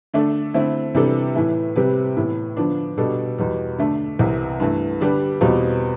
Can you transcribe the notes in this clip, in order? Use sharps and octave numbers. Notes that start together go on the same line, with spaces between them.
D3 A3 D4 A4
D3 A3 C4 E4
C3 E3 G3 D4 A4
A2 E3 A3
C3 G3 C4 G4 B4
A2 E3 B3
D3 F3 B3 D4
B2 G3 D4 A4
E2 B2 G3
D3 A3 D4
C2 C3 E3
G2 E3 A3
D3 G3 D4 G4 B4
E2 B2 G3 C4 F4